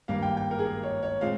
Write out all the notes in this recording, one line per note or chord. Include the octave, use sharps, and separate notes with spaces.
G#1 G2 G3 A#3 F5
G5
G5
A#4
G#4
A#4
C#5
C#5
A#2 G#3 C4 F5